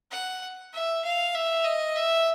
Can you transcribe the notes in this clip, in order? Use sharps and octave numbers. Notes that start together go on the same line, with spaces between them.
F#5
E5
F5
E5
D#5
E5